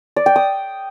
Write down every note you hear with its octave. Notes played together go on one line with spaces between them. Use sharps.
D5
G5
D#6